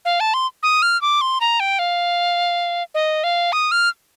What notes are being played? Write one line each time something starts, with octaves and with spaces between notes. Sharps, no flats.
F5
A5
C6
D#6
F6
D6
C6
A#5
G5
F5
D#5
F5
D#6
F6